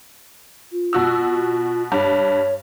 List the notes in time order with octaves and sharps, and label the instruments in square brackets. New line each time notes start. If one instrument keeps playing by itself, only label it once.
[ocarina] F4
[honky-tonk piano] B2 F#4 E6
[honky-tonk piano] G2 [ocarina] C#5